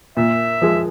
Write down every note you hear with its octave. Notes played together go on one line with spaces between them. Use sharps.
A#2 E5
F3 G#3